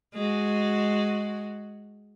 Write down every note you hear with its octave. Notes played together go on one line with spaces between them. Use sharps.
G#3 F#4